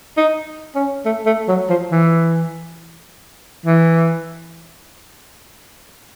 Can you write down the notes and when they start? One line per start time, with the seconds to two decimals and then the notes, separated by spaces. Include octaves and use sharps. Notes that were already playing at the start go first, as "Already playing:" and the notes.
0.17 D#4
0.75 C#4
1.05 A3
1.26 A3
1.48 F#3
1.69 F3
1.91 E3
3.66 E3